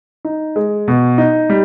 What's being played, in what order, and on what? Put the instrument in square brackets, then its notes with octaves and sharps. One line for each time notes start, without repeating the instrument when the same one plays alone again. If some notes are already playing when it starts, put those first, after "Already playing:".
[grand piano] D#4
G#3
B2
D#4
G3